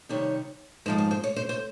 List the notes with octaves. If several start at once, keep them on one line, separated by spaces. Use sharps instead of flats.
F2 C3 D#3 G3 C#5
G#2 F3 G#3 C5
C5
C5
C#5
C5
C5